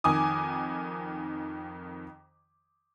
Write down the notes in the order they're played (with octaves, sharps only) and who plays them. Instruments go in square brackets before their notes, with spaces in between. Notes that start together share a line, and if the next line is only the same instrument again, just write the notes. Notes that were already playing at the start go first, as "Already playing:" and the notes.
[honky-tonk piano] F2 D#3 G#5 D6 D#6